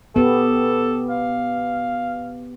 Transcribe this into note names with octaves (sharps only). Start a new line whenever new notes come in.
B3 G4 A4
F5